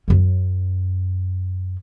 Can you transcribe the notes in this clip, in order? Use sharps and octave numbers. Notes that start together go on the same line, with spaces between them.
F#2 C#4